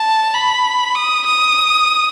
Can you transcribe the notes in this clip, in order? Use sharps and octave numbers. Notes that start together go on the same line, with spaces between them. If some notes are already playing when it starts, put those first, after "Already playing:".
Already playing: A5
B5
D#6
D#6